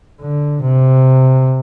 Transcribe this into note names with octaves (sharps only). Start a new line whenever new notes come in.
D3
C3